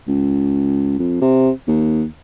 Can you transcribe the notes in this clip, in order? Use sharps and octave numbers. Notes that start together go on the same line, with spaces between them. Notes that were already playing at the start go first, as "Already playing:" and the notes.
C#2
F2
C3
D#2